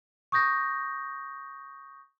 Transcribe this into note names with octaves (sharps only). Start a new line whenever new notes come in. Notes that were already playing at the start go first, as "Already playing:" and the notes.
C#6 D#6 G6 A#6